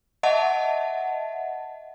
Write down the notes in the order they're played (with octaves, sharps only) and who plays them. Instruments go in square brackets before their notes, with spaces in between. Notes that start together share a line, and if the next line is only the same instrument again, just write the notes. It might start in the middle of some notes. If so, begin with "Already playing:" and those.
[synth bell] D#5 E5 F#5 A5